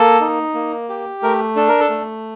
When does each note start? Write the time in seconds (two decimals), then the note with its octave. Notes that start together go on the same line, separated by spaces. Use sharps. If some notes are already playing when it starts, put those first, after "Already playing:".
Already playing: A#3 A4
0.21 D#4
0.54 A#3
0.89 G4
1.22 A3 A#4
1.56 D4 A4
1.68 A#4
1.80 A4
1.89 A3